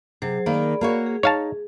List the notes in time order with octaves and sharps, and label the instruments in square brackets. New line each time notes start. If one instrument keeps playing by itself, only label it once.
[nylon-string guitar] C3 [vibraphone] F#3 G#4 C5
[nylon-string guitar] D#3 A#3 [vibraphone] G#4 D5 B5
[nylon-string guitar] A#3 F#4 C#5
[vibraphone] G#4
[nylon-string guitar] D#4 [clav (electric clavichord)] C#5 F5 A5